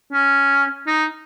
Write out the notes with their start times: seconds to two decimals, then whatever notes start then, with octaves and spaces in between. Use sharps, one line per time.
0.13 C#4
0.87 D#4